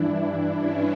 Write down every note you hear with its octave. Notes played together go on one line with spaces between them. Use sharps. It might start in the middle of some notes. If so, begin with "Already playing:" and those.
Already playing: G2 E3 D4 E4
C#4